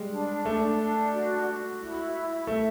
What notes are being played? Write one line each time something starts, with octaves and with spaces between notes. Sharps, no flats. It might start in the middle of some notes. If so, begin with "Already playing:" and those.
Already playing: G3 G#3
D4
A3 D4
D4
F#4
F#4
E4
E5
A3 E5